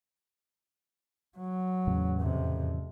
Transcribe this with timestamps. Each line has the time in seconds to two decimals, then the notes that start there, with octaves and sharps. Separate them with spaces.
1.37 F#3
1.87 E2 A2 C#3
2.20 F2 C3